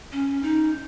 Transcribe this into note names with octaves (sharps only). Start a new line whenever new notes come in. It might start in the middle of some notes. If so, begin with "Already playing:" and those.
C#4
D#4